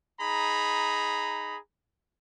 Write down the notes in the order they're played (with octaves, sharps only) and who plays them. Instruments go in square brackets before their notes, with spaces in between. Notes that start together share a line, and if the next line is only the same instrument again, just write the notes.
[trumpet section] D#4 G#4 A#5 B5